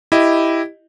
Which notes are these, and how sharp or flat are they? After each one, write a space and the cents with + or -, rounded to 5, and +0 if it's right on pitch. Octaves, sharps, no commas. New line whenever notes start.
E4 +0 G4 +0 D#5 +0